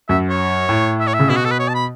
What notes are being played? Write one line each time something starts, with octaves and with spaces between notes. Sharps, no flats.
F#2 E5
C#5
A2
E5
C#5
E5
C#3
B2 E4
F#4
A4
B4
C#5
A5
B5